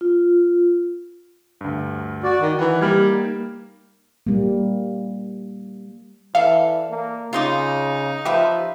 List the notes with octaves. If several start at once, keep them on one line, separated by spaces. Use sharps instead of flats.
F4
D2 G2
F#4 D5
D#3
E3 D#4 F#5
G3 A#3 F6 G#6
G3 A#3
E3 A4 D5 E5 F5
A#3
C#3 D#4 F4 C6 D6
F3 G4 B4 E5 F5